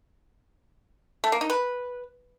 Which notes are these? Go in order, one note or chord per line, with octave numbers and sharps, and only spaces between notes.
A3
A#3
D#4
B4